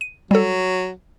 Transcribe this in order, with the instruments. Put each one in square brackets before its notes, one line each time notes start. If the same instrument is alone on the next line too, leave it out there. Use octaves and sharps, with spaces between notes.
[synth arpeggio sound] D#7
[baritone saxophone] F#3 [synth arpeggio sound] G3 A4